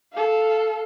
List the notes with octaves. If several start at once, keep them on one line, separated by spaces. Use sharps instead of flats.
A4 F5